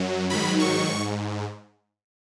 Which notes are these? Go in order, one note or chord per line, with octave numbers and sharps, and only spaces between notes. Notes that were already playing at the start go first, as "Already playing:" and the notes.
Already playing: F#2 F#3
G#2 D#3 F#3 B5
C#6
G#2